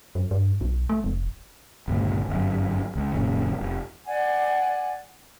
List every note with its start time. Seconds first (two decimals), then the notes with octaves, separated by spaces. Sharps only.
0.15 F#2
0.31 G2
0.61 B1
0.89 A3
1.04 F1
1.88 G1 C#2 A#2
2.28 G1 F#2
2.96 C#2
3.14 D#1 F#2 A#2 C#3
3.61 F1
4.06 D5 F#5 G#5